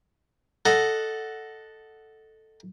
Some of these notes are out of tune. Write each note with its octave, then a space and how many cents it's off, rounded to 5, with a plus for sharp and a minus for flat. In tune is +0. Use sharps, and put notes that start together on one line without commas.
A4 +0 D#5 +0 F#5 +0